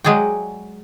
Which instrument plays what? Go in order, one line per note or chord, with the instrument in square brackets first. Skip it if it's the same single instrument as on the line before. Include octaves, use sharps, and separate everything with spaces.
[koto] F#3 G#3 G#4 D5 G5